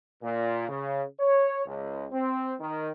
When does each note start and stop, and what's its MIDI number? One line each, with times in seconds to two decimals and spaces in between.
0.23 0.65 46
0.69 1.03 49
1.20 1.66 73
1.66 2.06 37
2.12 2.53 60
2.60 2.91 51